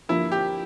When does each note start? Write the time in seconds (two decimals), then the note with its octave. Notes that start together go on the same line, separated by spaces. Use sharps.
0.09 G2 D3 F3 A#3 E4 F4
0.32 G4